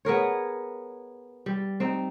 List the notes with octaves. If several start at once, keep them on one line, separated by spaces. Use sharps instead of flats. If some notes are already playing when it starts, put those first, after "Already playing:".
B3 G#4 A#4 C#5
G3
C4 D#4